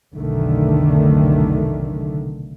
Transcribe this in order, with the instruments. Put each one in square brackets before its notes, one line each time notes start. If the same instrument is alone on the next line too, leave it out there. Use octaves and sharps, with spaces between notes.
[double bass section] F1 B1 D3 D#3 A3